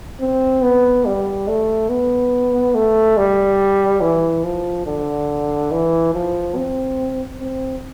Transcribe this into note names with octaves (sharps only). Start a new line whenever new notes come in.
C4
B3
G3
A3
B3
A3
G3
E3
F3
D3
E3
F3
C4
C4